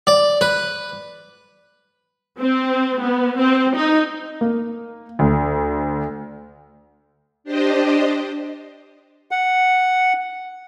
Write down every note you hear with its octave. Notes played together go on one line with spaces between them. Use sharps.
D5
B4
C4
B3
C4
D#4
A#3
D2
D4 G4 C5 D#5
F#5